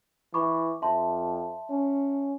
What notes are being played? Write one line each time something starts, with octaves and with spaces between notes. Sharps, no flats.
E3 B5 C#6 D6
F2 E5 A5 C6
C#4